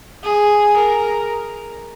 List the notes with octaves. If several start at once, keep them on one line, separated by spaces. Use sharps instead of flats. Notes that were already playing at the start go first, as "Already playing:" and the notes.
G#4
A#4